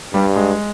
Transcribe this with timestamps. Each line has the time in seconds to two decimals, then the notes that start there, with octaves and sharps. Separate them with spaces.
0.13 G2 G3
0.36 G#3